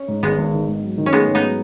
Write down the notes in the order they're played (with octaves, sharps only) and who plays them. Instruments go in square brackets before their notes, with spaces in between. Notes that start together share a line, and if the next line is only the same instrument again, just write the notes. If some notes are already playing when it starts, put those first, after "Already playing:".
Already playing: [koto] C#4
[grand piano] G#2
[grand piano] G#1 [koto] G#3 B3
[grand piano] G#1
D#3
G#2
F#3
D#3
[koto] C#4
[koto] G#3 B3 [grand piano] A3
[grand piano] G#2
[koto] B3 D#4
[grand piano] F#3